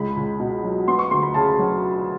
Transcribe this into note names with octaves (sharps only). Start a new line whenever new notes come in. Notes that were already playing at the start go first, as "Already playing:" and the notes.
Already playing: C#2 G#3 B5
C#2
B2
F#3
B3 C6
C#6
D2 C6
B5
C#3 A5
F#3